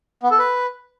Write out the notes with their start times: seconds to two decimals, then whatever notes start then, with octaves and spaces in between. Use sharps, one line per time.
0.23 B3
0.31 A4
0.39 B4